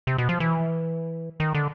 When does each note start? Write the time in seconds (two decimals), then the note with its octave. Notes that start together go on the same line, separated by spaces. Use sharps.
0.07 C3
0.18 B2
0.29 F3
0.40 E3
1.40 D#3
1.55 D3